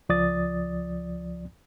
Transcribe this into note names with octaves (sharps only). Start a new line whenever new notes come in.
C#2 F3 D5 D#6 A6